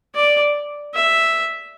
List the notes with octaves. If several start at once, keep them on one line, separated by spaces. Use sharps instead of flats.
D5
E5